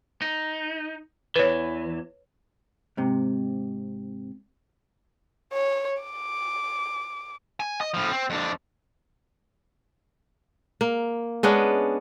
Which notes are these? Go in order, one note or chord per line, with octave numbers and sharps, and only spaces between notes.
D#4
E2 E3 B4 C#5
G#2 C3
C#5
D6
G#5
D#5
A2 F3
C4
F2 D4
A#3
G#3 B3 C#4 D4